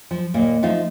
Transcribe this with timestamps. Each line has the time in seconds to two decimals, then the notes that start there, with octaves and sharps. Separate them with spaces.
0.11 F3
0.34 D#2 A#2 A#3
0.63 F3 A3 D#4 F4